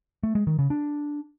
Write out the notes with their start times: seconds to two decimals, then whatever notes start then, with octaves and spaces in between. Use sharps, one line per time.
0.23 A3
0.35 G#3
0.47 D#3
0.59 C#3
0.70 D4